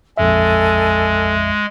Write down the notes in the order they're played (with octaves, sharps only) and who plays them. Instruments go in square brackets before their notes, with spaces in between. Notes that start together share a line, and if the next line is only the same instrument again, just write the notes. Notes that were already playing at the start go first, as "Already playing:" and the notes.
[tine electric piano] A#1 F2 E5 [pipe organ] G#3 [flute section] A4 G#5